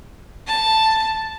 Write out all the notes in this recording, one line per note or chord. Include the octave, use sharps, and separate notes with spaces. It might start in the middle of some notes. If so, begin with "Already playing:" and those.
A5